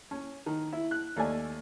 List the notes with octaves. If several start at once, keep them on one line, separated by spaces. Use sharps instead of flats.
C#4
D#3
E4
F#6
D#2 A3 D5 G#5